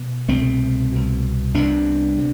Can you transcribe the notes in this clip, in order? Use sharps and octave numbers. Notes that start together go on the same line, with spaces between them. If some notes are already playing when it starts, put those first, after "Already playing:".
Already playing: B2
C2 B2 A3 C4
C2 B2
C2 C3 B3 D4
C3